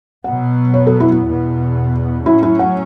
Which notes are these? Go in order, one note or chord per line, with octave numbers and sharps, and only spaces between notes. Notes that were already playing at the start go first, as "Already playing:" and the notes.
B2 F#3 B3 F#5
C#5
A4
E4
E4
E2 B2 B3
A2 F#3 C#4 E4
E4
F#5